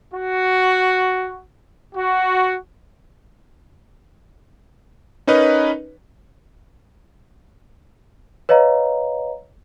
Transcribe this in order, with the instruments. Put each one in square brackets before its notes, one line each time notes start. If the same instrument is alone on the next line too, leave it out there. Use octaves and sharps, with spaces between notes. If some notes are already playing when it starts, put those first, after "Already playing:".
[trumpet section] F#4
F#4
[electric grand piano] C#4 D#4 A#4 B4 C#5 D#5
[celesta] B4 C#5 D#5 F5 A#5